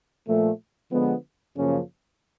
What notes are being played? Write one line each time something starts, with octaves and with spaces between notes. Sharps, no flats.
A#2 F3 A3
D3 F3 G#3 B3
F#2 C#3 F3 A#3 C#4